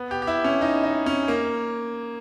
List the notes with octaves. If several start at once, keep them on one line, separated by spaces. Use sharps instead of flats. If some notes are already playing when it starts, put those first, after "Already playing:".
Already playing: B3
G4
G4
E4
C#4
D#4
D#4
C#4
A#3